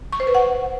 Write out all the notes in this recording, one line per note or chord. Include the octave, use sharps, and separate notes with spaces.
C#6
C5
B4
F#5